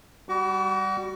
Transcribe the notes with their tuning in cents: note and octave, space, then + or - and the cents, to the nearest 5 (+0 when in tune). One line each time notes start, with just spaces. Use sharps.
G3 +0 F#4 +25 D6 -45